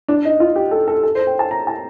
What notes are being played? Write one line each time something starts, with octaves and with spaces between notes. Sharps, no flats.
D4
D#4
F4
G4
A4
A4
A4
C5
G5
A5
A#5
A5